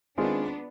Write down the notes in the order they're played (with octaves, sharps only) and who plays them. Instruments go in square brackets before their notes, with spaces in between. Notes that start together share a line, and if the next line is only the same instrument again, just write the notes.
[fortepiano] D#3 G#3 C4 F4 G#4 [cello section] B3 D4